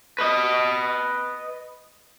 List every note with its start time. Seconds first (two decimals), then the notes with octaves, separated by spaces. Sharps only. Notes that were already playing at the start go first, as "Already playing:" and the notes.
0.18 B4 D#5